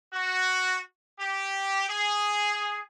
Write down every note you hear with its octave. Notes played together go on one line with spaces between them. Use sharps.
F#4
G4
G#4